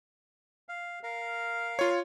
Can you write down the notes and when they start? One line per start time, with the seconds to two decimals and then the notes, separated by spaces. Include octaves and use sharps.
0.69 F5
1.03 A#4 F5
1.79 F4 C#5